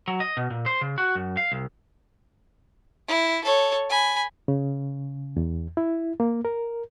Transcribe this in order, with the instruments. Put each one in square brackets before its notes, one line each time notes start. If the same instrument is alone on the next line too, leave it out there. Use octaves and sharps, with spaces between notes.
[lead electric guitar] F#3
D#5
B2
A#2
C5
C#3
F#4
F#2
F5
C2
[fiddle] E4
A4 C#5
G#5 B5
[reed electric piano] C#3
E2
E4
A#3
A#4